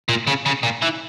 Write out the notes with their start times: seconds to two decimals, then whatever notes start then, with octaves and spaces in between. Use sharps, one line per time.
0.09 A#2
0.27 C#3
0.46 C#3
0.63 A#2
0.82 E3